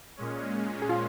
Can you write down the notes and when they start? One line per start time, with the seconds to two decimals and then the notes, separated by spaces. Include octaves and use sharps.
0.17 A#2 G#3 C#4
0.82 G#4
0.89 F4